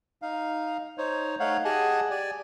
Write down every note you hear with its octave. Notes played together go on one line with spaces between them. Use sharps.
D#4 F5
D#4 C5 C#5
A3 D#4 C#5 F5 F#5
G4 G#4 D#5 F#5 G#5 A5
G4 D5 G#5